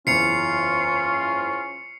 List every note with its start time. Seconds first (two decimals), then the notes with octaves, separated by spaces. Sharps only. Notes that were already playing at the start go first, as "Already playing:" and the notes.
0.07 F#1 E2 C#4 F4 C7 C#7 F7